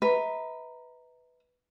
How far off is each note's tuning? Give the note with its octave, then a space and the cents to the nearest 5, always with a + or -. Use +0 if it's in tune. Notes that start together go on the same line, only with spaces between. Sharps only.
B4 +5 E5 -45 A#5 -5